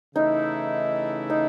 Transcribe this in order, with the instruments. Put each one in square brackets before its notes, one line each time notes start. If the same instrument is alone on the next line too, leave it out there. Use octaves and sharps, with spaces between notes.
[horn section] C#3 E3 A3 E4 [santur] D#4
[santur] D#4